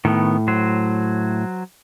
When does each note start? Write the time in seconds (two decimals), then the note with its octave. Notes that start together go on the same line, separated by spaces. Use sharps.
0.05 A2 D#3 B3
0.48 F#3 C5